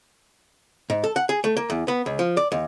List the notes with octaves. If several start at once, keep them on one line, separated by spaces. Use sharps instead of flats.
G#2
A4
F#5
G#4
A3
A#3
E2
B3
C#2
F3
D5
D#2